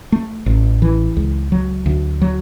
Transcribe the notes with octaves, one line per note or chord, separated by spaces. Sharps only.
A3
A1
E3
C#2
F#3
D2
F#3